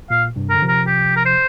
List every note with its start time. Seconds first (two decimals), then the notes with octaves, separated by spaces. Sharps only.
0.10 A#2 F5
0.36 G2 C3
0.50 A#4
0.55 D3
0.62 C3 F3
0.68 A#4
0.87 G4
1.16 A#4
1.25 C5